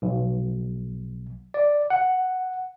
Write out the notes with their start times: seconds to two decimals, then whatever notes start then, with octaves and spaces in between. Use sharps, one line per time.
0.02 B1
1.54 D5
1.90 F#5